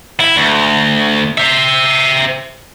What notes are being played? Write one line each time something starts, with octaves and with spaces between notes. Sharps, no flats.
E4
D2
C5 E5